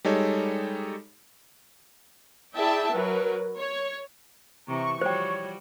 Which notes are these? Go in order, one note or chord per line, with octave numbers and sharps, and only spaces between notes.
G3 G#3 D#4 A4 C#5
E4 G#4 D5 E5 G5 A5
F#3 A#4 B4
C#5
C3 E3 A#5 C#6
F3 G3 F#4 C5 C#5 G5